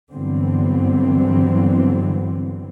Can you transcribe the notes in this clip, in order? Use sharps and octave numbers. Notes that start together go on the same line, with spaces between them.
G2 D3 E3 F#3 B3 C4